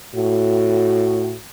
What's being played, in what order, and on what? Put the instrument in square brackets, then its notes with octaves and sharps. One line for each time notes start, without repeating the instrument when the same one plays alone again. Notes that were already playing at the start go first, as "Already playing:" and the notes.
[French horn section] A2 F#4